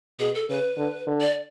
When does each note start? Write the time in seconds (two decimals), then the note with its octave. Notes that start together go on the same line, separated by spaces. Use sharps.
0.20 B2 G#4
0.35 A4
0.49 C#3 B4
0.77 D3
1.07 D3
1.21 D5